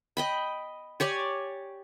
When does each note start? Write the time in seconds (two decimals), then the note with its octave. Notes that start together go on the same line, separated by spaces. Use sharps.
0.17 D#5 G5 B5
1.00 G4 C#5 D5 G#5